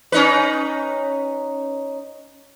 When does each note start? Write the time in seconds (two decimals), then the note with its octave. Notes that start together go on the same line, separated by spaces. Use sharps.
0.12 C#4 D#4 B4